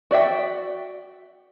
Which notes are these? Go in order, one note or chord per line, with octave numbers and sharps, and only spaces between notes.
F#4 D5 E5 G5